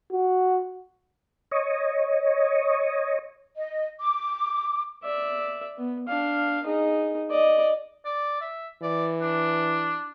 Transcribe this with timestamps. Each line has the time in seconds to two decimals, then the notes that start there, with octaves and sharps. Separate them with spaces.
0.12 F#4
1.51 C#5 D#5
3.56 D#5
4.00 D6
5.04 D5 E5
5.78 B3
6.08 D4 F5
6.64 D#4 G#4
7.30 D5 D#5
8.05 D5
8.41 E5
8.83 E3 D5
9.21 D4